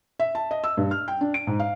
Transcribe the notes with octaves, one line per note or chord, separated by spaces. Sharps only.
E5
A5
D#5
E6
G2
F6
G5
D4
D7
G#2
F5